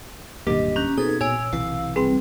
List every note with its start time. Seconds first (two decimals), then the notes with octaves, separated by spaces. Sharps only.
0.47 D1 G2 B2 D#3 A#3 G4 D#5
0.76 C#4 A#5 F#6 G6
0.98 B2 C4 D#4 G#4 A4 B4 G#6
1.21 A#2 C#5 G#5 E6 D7
1.53 B1 C3 E3 F5
1.96 G3 C4 G#4 B4 C6